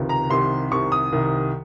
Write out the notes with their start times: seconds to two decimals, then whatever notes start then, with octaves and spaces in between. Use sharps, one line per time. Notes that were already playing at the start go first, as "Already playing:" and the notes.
Already playing: C#2 C3 D#3
0.09 A#5
0.30 C2 C3 D#3 C6
0.71 C2 C3 D#3 C#6
0.92 D#6
1.11 C2 C3 D#3